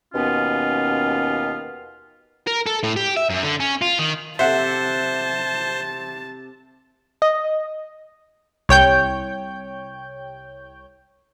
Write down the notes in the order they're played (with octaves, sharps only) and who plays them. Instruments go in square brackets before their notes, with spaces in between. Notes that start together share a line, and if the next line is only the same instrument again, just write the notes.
[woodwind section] D#2 B2 B3 C#4 F4
[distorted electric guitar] A#4
A4
A2
G4
E5
F#2
D3
C#4
F4
D#3
[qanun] C3 A4 [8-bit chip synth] C5 [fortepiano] E5 F#5 [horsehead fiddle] A5
[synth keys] D#5
[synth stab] C2 C#5 G5 G6